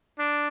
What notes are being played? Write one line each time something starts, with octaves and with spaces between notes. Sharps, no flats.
D4